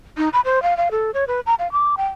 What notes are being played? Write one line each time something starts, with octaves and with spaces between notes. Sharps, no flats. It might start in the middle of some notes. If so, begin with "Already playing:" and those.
D#4
B5
C5
F5
F5
A4
C#5
B4
A#5
F5
D6
G5